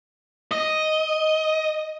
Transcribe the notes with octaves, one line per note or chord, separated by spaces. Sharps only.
D#5